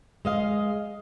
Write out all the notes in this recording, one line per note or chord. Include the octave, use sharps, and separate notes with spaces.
G#3 D#5 F5